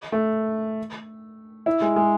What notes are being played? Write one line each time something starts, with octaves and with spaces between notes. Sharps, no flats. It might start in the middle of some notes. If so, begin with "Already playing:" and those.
A3
E4
G#3
G#3